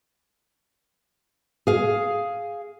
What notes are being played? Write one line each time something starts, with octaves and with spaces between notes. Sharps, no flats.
G#4 F5